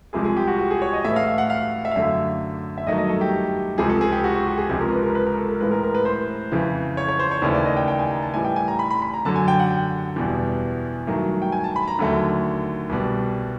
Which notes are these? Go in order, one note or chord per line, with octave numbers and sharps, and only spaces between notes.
C2 C3 F3 G#3 G#4
G#4
G4
F#4
F#4
G#4
C#5
D#5
A2 E3 A3 E5
F5
F5
F#5
F5
E5
F5
F#2 D3 F#3 A3 E5
E5
G2 D#3 F#3 A3 D#5
D#5
A4
G4
C#2 C3 F3 G#4
A4
G#4
G4
F#4
F#4
G4
G#4
C#2 C3 F3 G#3 G#4
A#4
B4
A#4
B4
A#4
A4
A#4
A2 E3 G#3 B4
A#4
A#4
B4
C5
F2 C#3 E3
C#5
C#5
C5
C#5
D#2 C#3 E3 A3 D5
D5
D#5
G5
G5
G#5
A#5
A5
A2 E3 G3 G#5
G5
G#5
A#5
B5
B5
B5
A#5
F#2 D3 F#3 A5
G#5
G5
F#5
G5
E2 B2 G3
G2 D#3 F#3 A3
G5
G#5
A5
B5
A#5
D#2 D3 F#3 A3
C2 B2 G3